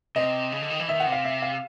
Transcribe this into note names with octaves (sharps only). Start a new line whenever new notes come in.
C3 D#5
C#3
D3
D#3
E3
D#3 E5
F#5
C3
F5
E5
F5